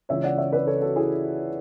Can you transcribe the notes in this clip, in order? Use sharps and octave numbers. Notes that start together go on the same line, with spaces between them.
C#2 C#3 E3 C#5 E5
D5 F#5
C#5 E5
B4 D5
A4 C#5
F#4 A4
E4 G#4